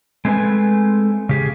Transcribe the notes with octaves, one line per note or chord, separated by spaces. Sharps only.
G#3 A3 C4 D#4 B4 G#5
C#3 G4 G#4